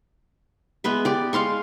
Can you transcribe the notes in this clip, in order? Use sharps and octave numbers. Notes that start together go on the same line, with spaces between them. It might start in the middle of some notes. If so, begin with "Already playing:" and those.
G#3 B3 B4 E5
G4 D5
G#3 F5 C6 C#6